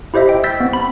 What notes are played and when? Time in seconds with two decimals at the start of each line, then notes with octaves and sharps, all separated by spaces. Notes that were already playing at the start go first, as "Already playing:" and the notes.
0.14 E4 G4 C5 D#5 E5
0.29 G5
0.44 E6 G6 A6 B6
0.60 B3 C4
0.73 B5